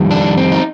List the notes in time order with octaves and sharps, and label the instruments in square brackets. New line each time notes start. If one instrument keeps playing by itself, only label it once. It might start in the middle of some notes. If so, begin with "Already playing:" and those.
Already playing: [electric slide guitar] F2 D#3 G3
D4
C4
D#4